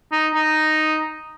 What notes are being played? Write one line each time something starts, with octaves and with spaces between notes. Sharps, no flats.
D#4
D#4